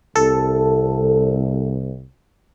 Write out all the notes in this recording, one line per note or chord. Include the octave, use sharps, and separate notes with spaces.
C2 A4